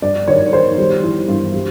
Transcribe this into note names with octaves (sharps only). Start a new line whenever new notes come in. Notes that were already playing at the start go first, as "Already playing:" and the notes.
G2 D5
D#3 C#5
D#3 C5
G3
E3
G2
G3